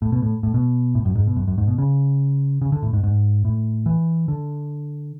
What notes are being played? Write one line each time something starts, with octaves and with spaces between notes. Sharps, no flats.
A2
B2
A2
A2
B2
A2
F#2
G#2
B2
F#2
F#2
G#2
B2
C#3
C#3
D3
A2
G#2
G#2
A2
E3
D3